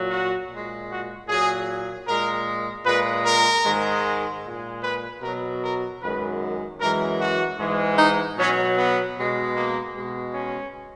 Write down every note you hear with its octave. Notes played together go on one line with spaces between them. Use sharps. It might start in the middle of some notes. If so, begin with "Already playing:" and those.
Already playing: A#2 F#3
F#4
A#2 G#3
F#4
A#2 F#3 G#4
A#2 G#3 A#4
A#2 G#3 B4
A#4
G#2 D#3 G#3
A#2 G#3
B4
B2 F#3 A#4
A#4
F#2 D#3 G#3 B4
F#2 E3 G#3 A#4
F#4
G#2 E3 G#3
D#4
B2 F#3 C#4
B3
B2 G#3
A#3
B2 G#3
C#4